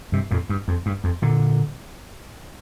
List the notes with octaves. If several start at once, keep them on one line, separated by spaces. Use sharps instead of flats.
G2 C3
F2 A#2
G2
F2
G2
F2
A#2 D3